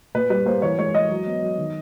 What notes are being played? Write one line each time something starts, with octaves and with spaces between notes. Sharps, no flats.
A#2 B4
G3 B4
A#3 C5
E3 C#5
G#3 C#5
G#3 D#5
F#3
B3
F#3
D#3